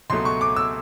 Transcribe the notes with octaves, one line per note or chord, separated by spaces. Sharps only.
C#2 B2 F#3 A3 C6
C#6
D6
E6